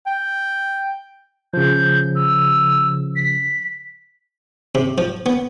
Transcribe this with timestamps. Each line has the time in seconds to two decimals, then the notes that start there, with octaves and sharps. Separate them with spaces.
0.06 G5
1.53 C#3 F3 G6
2.15 E6
3.16 B6
4.75 C3
4.98 F3
5.26 B3